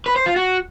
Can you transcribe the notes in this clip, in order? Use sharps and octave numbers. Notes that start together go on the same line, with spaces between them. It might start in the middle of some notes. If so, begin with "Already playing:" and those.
B4
C5
F4
F#4